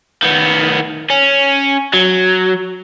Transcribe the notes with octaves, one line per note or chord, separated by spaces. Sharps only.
D#3 B3
C#4
F#3